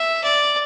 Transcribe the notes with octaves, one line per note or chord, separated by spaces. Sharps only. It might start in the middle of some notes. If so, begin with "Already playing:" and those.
Already playing: E5
D5